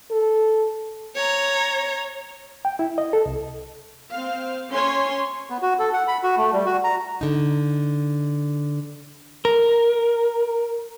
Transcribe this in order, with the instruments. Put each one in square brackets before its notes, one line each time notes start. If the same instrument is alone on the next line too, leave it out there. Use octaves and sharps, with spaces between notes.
[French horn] A4
[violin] C#5 A#5
[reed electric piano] G5
E4
D#5
A4
C2
[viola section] C4 F5
C#4 C#5 G#5 C6
[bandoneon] B3
F#4
A4
F#5
B5
F#4
A3
G3
F#4
A#5
[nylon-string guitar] D3 D#4
[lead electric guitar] A#4